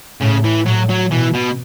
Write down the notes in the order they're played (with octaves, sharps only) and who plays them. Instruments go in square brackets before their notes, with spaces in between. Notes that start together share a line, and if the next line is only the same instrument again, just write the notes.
[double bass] A2 [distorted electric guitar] C#3
[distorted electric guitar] E3
[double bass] A2 [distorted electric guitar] F#3
[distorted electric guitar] F#3
[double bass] B2 [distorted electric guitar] E3
[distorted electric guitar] B2